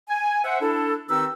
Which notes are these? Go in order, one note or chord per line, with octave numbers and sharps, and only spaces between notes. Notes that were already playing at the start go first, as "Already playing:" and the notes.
G#5
C5 E5 F#5
D4 E4 A4
D#3 C4 D#4 G4 B4 E6